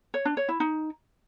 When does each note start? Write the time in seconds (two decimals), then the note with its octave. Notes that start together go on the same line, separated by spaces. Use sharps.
0.14 C#5
0.25 D4
0.37 C#5
0.49 E4
0.60 D#4